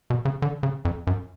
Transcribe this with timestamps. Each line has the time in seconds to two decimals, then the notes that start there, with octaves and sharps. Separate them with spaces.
0.10 B2
0.25 C#3
0.42 D3
0.63 C#3
0.85 F2
1.07 F#2